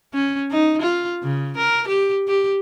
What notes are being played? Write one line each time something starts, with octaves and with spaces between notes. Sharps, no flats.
C#4
D#4
F4
C#3
A#4
G4
G4